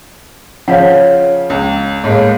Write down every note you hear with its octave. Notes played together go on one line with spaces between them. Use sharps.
C#3 F3 C#5 F5 F#5
C#2
A2 G#3 A#3